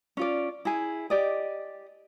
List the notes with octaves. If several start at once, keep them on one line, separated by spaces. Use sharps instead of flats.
C#4 F4 D5
E4 G#4
G4 D5 D#5